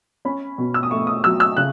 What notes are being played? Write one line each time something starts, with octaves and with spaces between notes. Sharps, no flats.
C#4 B5
B2
E6
D#6
A3 C#6
D#6
F#3 E6
E6
C#3 F#6